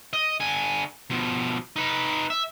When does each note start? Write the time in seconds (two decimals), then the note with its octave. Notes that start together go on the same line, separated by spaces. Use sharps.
0.13 D#5
0.40 D3 G#5
1.10 B2 F3
1.76 D#4 B4
2.30 E5